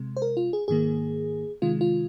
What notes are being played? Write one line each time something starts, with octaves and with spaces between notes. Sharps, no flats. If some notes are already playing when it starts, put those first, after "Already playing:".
Already playing: C3 G#3
C5
A#4
F4
G#4
G#2 D#3 A#3 G#4
C3 D#3 G#3 F4
F4